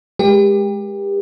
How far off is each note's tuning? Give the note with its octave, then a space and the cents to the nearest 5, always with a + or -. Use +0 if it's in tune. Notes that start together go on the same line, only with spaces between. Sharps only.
G#3 +0 G4 +25 A#4 +40